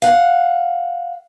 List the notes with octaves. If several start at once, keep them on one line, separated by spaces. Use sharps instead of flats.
F5 F#5